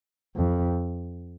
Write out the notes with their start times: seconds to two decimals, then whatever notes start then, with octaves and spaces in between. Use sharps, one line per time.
0.36 F2